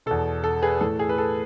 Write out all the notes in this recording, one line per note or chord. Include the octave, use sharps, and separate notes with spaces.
E2 B2 A4
A4
G#4 B4
A2 E3 A4
G#4
B4
A4